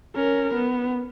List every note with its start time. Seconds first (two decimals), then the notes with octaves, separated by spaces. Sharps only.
0.15 C#4 A#4
0.54 B3